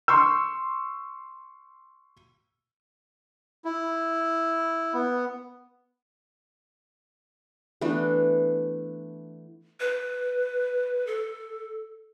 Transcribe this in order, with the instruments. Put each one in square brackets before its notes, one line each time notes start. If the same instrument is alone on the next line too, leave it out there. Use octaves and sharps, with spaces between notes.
[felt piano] C6 C#6 E6
[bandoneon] E4
B3
[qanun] E3 A3 B3 D4
[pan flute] B4
A4